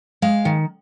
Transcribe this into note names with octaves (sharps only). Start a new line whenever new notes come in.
G#3 F5
D#3